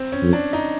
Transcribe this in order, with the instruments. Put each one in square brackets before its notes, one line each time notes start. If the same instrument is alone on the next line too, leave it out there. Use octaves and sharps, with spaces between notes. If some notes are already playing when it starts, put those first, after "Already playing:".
Already playing: [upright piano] C4
C#4
[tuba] F2
[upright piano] D4
D#4